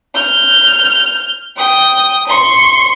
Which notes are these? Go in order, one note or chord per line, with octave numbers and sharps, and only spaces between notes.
F6 G6
G5 D#6
C6 C#6